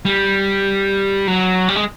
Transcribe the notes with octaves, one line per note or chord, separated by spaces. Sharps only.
G3
F#3
G3
G#3